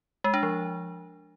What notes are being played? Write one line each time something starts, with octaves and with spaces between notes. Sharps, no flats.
G#3
D4
F3